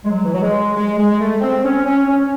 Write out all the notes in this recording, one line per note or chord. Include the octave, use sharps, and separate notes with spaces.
G#3
F#3
E3
F#3
G#3
G#3
G#3
A3
C4
C#4
C#4
C#4